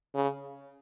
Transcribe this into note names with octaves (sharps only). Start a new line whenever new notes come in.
C#3